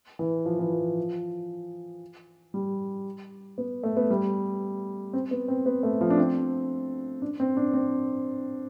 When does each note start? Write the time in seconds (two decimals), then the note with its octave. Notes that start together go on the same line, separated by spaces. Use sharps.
0.19 E3
0.46 F3
0.59 E3
0.72 F3
2.54 G3
3.58 B3
3.84 A3
3.97 B3
4.10 G3
5.13 C4
5.31 B3
5.48 C4
5.66 B3
5.83 A3
6.01 F3
6.10 D4
6.18 C4
7.22 D4
7.40 C4
7.57 D4
7.74 C4